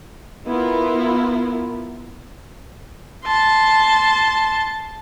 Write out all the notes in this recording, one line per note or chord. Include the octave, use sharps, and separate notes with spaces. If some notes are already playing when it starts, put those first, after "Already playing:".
B3 E4 F4 A#4
A5 C6